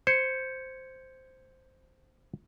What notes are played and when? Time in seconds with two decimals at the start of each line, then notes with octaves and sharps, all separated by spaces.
0.07 C5 G6 G#6 C#7